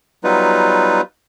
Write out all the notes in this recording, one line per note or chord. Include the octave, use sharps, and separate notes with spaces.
F#3 G3 B3 D#4 F4 B4